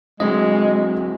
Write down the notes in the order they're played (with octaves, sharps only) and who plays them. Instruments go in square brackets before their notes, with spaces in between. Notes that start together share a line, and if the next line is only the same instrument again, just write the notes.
[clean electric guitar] F#3 C4 E4 [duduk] G#3 [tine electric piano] D#5